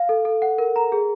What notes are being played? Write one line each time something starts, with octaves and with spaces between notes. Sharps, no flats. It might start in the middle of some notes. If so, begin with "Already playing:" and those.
Already playing: F5
A4
A4
F#5
A#4
A#5
G#4